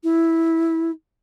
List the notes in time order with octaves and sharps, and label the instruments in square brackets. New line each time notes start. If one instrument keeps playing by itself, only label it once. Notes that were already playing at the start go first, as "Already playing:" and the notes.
[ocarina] E4